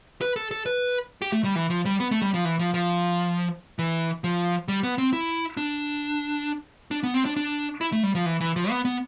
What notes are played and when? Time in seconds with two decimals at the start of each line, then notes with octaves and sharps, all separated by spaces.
0.21 B4
0.36 A4
0.51 A4
0.66 B4
1.22 G4
1.32 A3
1.44 G3
1.55 E3
1.70 F3
1.85 G3
2.00 B3
2.11 A3
2.22 G3
2.34 F3
2.45 E3
2.59 F3
2.74 F3
3.79 E3
4.24 F3
4.68 G3
4.83 B3
4.98 C4
5.13 E4
5.57 D4
6.91 D4
7.03 B3
7.14 C4
7.25 D4
7.36 D4
7.81 E4
7.92 A3
8.03 G3
8.15 F3
8.26 E3
8.41 E3
8.56 F3
8.70 B3
8.85 B3